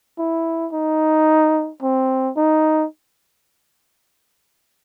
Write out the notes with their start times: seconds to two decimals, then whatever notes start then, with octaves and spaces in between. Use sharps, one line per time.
0.19 E4
0.73 D#4
1.82 C4
2.37 D#4